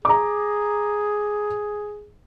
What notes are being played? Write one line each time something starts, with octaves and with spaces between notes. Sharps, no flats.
G#4 A#5 D6